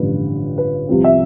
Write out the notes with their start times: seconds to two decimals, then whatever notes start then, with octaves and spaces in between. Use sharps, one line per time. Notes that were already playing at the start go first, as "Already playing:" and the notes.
Already playing: A1 G2 D3 F3 B4
0.58 B4
0.89 C2 C3 F3 C4
1.04 E5